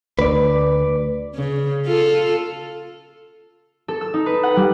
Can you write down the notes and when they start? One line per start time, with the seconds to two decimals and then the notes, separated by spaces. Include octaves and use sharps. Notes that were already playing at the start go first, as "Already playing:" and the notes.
0.19 D2 B4 D5
1.35 C#3
1.86 F4 A4
3.88 A4
4.01 E6
4.14 D#4
4.26 B4
4.43 F#5
4.56 G3